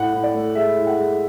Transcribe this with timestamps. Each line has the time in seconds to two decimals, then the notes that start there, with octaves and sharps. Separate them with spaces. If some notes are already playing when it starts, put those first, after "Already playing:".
Already playing: A2 F#5
0.12 A2
0.23 D5
0.33 A3
0.55 G#3 E5
0.76 A2
0.87 F#5
0.98 G#3